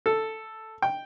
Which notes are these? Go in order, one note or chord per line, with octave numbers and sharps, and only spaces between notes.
A4
G5